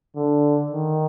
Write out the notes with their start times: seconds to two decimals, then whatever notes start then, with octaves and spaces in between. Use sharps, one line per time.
0.16 D3
0.72 D#3